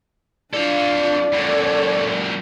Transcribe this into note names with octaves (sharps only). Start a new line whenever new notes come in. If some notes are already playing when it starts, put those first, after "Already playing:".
D4 F4 A4 D5 F5
F#2 A#2 A4 C#5